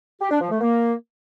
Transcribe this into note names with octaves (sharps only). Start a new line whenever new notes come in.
G4
D4
F3
A3
A#3